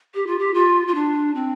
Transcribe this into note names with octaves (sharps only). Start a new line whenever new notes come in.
G4
F4
G4
F4
F4
D4
C4